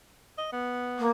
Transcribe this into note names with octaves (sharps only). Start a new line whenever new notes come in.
D#5
B3
A#3